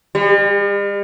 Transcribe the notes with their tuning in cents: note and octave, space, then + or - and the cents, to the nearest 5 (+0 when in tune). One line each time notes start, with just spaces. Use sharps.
G3 +45